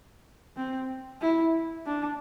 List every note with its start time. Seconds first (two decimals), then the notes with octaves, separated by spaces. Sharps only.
0.56 C4
1.21 E4
1.86 D4